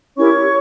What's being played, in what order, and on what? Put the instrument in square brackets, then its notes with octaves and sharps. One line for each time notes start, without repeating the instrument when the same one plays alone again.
[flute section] C#4 E4 G4 A#4 C#5 C#6